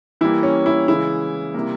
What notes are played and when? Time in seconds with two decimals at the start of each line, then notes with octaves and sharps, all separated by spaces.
0.21 E3 G3 A#3 E4
0.43 C#4
0.66 E4
0.88 C#3 E3 G#3 E4
1.54 C3 G3 A#3